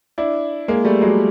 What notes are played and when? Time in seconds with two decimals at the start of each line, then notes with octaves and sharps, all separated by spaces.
0.18 D4 E4
0.68 G#3 A#3
0.85 G3 A3
1.02 F#3 G#3